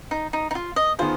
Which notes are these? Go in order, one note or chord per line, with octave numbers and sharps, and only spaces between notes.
D#4
D#4
D#4
F4
D#5
D#3 B3 F4 G#4 C5